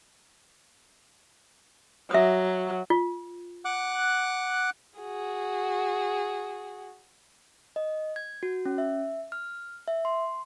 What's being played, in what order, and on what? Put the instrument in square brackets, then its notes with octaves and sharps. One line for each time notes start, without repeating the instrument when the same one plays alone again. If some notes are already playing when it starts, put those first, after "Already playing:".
[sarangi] F#3 [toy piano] E5 D#6
[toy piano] F4
[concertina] F#5 D6 F#6
[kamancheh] F#4 G#4
[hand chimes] D#5
G#6
F#4
C#4
E5
F6
E5
C6